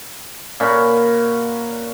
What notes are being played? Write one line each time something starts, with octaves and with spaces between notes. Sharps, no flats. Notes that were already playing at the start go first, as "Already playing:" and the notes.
A#2 C#4 F#4 B5